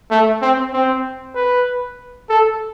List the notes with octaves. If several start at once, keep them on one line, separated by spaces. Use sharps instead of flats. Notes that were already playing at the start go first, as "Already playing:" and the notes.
A3
C4
C4
B4
A4